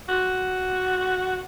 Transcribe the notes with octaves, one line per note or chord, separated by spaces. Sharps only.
F#4